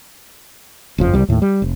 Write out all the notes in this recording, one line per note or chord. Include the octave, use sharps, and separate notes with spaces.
F#1 F2 F3
C2 G3
D#2 A2
G3
F1